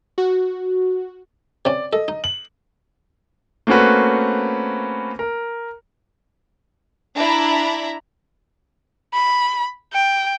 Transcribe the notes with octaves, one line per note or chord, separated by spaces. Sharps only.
F#4
C3 C#4 D5
A4 D#5
D#4
F#7
A3 A#3 C4 C#4 F#4 B4
A#4
D4 E4 A#5 B5
B5
G5